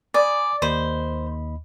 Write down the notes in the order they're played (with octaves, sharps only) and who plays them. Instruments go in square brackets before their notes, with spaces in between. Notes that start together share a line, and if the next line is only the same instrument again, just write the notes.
[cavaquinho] D5 [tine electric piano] G#5 B5 D#6
[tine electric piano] D#2 D#5 B5 [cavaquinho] C5